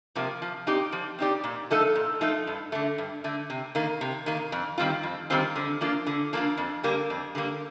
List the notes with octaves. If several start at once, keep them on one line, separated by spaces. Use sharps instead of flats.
C3 F3 A#3
F3
C4 D#4 G4 D5
F3
C4 D#4 G4 D5
A#2
F3 A3 D#4 A4
A#2
F3 A3 D#4 A4
G2
D3 A3
G2
D3 A3
C3
D#3 A#3
C3
D#3 A#3
F2
D#3 G3 C4 F4
F2
D#3 G3 C4 F4
D3
F3 A#3 D4 F4
D3
F3 A#3 D4 F4
F2
D3 G3 A#3
F2
D3 G3 A#3